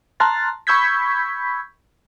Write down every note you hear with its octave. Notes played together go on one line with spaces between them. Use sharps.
A5 A#5 C6 F6 F#6 A6
B5 C#6 E6 G6 G#6 B6